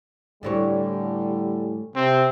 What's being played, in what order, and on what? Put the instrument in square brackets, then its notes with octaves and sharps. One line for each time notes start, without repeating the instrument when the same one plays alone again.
[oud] A2 E3 C#5 [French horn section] D3 G3
[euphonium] C3 [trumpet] C4